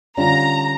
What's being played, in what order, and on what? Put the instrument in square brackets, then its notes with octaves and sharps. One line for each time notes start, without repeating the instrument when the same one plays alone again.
[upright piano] D3 G3 C#4 F4 [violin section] A#5